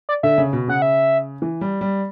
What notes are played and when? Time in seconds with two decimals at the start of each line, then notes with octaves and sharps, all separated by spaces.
0.09 D5
0.23 D3 E5
0.38 C#3
0.53 B2
0.68 C#3 F#5
0.82 E5
1.42 E3
1.61 G3
1.81 G3